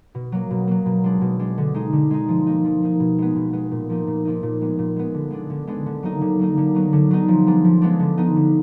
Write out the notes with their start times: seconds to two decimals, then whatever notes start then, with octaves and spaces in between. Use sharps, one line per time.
0.15 B2
0.32 F#3 A#3
0.51 B2
0.67 F#3 A#3
0.86 B2
1.04 G#3 D4
1.21 B2
1.39 G#3 D4
1.58 D3
1.74 G#3 D#4
1.93 D3
2.10 G#3 D#4
2.28 F3
2.46 A#3 D#4
2.65 F3
2.83 A#3 D#4
3.00 B2
3.18 G#3 B3
3.36 B2
3.53 G#3 B3
3.71 A#2
3.89 F3 A#3 D#4
4.07 A#2
4.25 F3 A#3 D#4
4.43 A#2
4.61 G#3 B3
4.79 A#2
4.96 G#3 B3
5.14 D3
5.30 G#3 B3 D4
5.50 D3
5.67 G#3 B3 D4
5.86 D3
6.03 F#3 A#3 D#4
6.21 D3
6.39 F#3 A#3 D#4
6.57 D3
6.75 F#3 B3 D#4
6.93 D3
7.11 F#3 B3 D#4
7.28 F3
7.47 G#3 B3 D4
7.64 F3
7.81 G#3 B3 D4
8.00 D3
8.18 F3 B3 D#4
8.36 D3